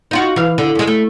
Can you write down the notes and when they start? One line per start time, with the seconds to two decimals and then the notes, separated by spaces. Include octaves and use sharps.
0.11 D#4 F4 F#4
0.36 E3 F5
0.58 D3
0.75 F#2 G#3
0.87 A3